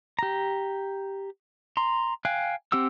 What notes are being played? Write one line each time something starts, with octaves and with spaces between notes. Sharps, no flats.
G4 A#5
A#5 C6
F5 G5 G#5 F#6
C4 G4 F#5 E6